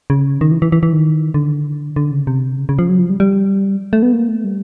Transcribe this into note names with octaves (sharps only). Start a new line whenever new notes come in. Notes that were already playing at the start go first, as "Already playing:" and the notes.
C#3
D#3
E3
E3
E3
E3
D#3
D3
D3
C#3
C3
C#3
C#3
F3
F#3
F3
G3
G3
A3
B3
A#3
A3
G3